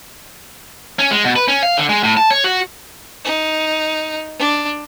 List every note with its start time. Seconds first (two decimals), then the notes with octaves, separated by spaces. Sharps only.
0.99 C#4
1.11 G#3
1.24 B2
1.36 B4
1.48 C#4
1.63 F5
1.77 D3
1.89 G#3
2.03 A2
2.17 A5
2.31 C#5
2.44 F#4
3.25 D#4
4.39 D4